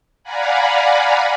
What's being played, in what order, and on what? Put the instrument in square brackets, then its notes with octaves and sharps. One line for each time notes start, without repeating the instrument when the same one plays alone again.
[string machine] D5 F5 F#5 G#5 A#5 B5